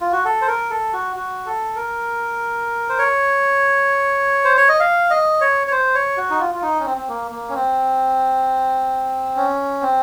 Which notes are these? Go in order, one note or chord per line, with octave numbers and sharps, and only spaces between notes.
F4
F#4
A4
C5
A#4
A4
F#4
F#4
A4
A#4
C5
C#5
C5
C#5
D#5
F5
D#5
C#5
C#5
C5
C#5
F#4
D#4
F4
F4
D#4
C#4
C4
C4
A#3
A#3
C#4
C4
C#4
C4